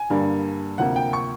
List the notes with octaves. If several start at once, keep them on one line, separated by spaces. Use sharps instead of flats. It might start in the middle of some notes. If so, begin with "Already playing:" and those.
Already playing: G#5
G2 D3 G3 A#3
D2 C3 F3 A#3 F#5
G5
C#6